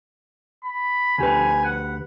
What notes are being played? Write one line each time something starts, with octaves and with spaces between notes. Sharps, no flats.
B5
D2 G4 B4 G#5
F#5